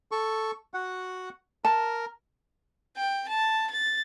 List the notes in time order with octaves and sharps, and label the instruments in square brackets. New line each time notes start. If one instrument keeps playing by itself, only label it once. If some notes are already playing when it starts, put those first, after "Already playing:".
[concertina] A4 C#6
F#4 F#5
[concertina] A#4 [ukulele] A5
[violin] G5
A5
A6